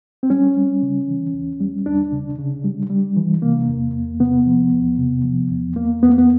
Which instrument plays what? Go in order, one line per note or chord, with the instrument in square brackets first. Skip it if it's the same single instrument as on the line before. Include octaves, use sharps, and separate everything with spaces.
[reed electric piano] C4
G3 C#4
G3
C#3
E3
D#2
G3
D#2 D4
C#3
C#3
G3
G3
E3
C3 A#3
E2
E2
C3 B3
F3
E2
C3
F3
E2
E2 A#3
E2 B3
A#3
B3